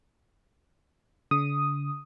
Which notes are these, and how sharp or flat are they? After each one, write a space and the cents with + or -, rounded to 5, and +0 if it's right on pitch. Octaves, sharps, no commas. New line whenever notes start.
D3 -45 D#6 +0